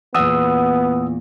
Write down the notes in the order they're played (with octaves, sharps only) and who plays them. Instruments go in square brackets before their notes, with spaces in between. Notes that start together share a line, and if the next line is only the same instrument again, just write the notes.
[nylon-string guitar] E2 A#2 [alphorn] B3 [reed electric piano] F#5 D#6 E6